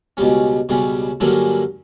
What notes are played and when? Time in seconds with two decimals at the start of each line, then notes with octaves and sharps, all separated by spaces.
0.17 C#2 B2 G3 C#4
0.69 C#2 B2 G3 C#4
1.20 G2 D3 F#3 A#3 C#4